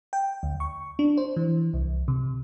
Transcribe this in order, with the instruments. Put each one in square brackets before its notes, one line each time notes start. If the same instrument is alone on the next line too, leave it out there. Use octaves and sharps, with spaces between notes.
[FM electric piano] G5
D2
C#6
D4
C5
E3
C2
C3